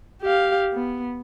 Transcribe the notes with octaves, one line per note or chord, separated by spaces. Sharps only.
G4 F5
B3